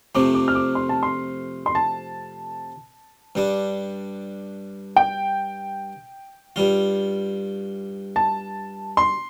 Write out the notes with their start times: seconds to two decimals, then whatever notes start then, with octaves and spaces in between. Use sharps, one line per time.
0.15 F2 C3 F3 A3 D6
0.34 D6
0.48 F6
0.55 D6
0.75 C6
0.89 A5
1.03 C6
1.66 C6
1.75 A5
3.35 G2 G3 D4
4.96 G5
6.56 G2 G3 F4
8.16 A5
8.97 C6